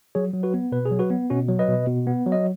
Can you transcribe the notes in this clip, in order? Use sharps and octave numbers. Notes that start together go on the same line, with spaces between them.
F#3 G#4 C#5
F#3
F#4 B4
B3
B2 B4
G#4
F#3
F#4 B4
B3
B2 C#4 F#4
F#3
B4 D#5
B2
B2
B3
F#3
D#5